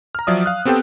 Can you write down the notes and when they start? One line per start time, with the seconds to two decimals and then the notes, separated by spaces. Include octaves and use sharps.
0.15 A#5 F6
0.27 F3 F#3 D5 E5 D#6
0.46 F5 F#6
0.65 B3 C4 G4 A4 C5 G5